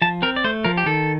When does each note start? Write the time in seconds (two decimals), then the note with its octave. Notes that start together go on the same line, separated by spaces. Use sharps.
0.02 F3 A5
0.22 C4 A#4
0.36 D5
0.44 A3 C5
0.64 F3 A#4
0.77 G4
0.86 D#3 A4